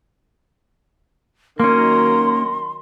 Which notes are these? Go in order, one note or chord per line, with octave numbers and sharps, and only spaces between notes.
D#3 F#3 A#3 C#4 A#5 C6